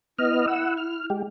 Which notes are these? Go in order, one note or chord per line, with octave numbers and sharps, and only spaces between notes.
B3 E4 D#5 F6
F#5 E6
F6
G#3 G4